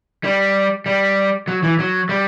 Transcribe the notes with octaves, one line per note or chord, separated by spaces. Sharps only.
G3
G3
F#3
E3
F#3
G3